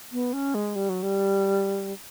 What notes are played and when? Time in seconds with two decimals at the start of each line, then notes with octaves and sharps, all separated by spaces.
0.12 B3
0.33 C#4
0.54 G#3
0.75 G3
0.89 F#3
1.03 G3